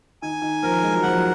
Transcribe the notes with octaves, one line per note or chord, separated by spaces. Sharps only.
D#3 G#5
D#3
F3 A#4
G#3
F#3
F3 F#5
F#3